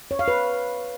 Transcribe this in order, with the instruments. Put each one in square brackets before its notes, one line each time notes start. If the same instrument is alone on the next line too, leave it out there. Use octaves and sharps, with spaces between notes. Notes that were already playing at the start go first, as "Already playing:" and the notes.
[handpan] C#5
F5
B4